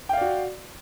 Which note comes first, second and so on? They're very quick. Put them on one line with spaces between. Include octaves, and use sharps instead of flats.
G5 F5 D5 F#4